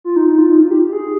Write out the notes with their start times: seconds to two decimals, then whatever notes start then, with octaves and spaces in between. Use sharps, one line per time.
0.04 F4
0.16 D#4
0.27 D#4
0.38 F4
0.49 D#4
0.60 F4
0.71 G4
0.82 G4
0.92 G#4